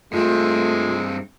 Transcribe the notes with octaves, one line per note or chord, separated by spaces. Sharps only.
G2 G#3 A3 C4 F4